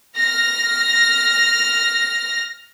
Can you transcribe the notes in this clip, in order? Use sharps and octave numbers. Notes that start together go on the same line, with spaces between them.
F6 A#6